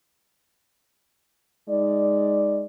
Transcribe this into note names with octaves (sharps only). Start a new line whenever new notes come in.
G#3 D#4 D5